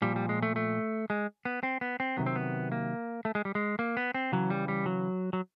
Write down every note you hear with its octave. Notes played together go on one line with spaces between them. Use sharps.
A#2 F3 G3
G3
G#3
A3
A3
G#3
B3
C4
B3
C4
C3 D#3 F#3 B3
C4
B3
A#3
A3
G#3
G3
G#3
A#3
B3
C4
C#3 E3 F#3
G3
G3
F#3
F#3